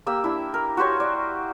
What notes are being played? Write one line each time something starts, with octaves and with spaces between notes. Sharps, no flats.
A#3 G4 E6
D4 E4
A#4
F#4 G4 C5 C#5
D5